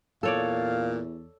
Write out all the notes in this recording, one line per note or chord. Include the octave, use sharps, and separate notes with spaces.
E2 A#2 A4 C#5 D5 F5